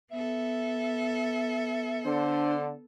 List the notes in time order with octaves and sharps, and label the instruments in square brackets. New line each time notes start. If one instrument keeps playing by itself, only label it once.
[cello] B3 A4 [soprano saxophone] E5
[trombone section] D3 [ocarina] D4 [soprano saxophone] C5